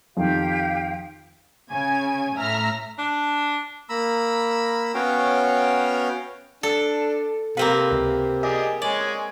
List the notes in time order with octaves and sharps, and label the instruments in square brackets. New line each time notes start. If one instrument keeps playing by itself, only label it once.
[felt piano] F2 D#3 [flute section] G4 F5 G5
[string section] C#3 C#5 G#5 G#6
A2 E5 A#5 F6
[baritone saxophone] D4
[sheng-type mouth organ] A#3 A#5 B5 E6
B3 C#4 F#4 C#5 F5 G5
[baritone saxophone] D4 [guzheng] A4
[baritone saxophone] C3 [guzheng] A#3 C4 B4 [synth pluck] F5
[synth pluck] C#2
[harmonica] G4 G#4 D5 [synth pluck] D#5
[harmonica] G#3 C#5 G#5 [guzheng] D5